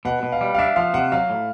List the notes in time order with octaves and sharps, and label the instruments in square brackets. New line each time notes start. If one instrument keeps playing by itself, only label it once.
[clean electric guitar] B2 [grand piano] F#5
[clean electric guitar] B2
[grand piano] F5
[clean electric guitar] G3
[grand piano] F5
[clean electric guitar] D4 [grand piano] E5
[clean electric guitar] F3 [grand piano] F5
[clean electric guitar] C3 [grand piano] F#5
[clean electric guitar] F#3 [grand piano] F5
[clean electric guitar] A2